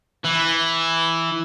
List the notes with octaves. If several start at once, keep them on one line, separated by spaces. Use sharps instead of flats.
E3